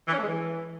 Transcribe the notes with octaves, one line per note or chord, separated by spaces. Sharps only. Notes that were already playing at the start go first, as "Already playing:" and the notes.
E3
C#4
A3
G#3
E3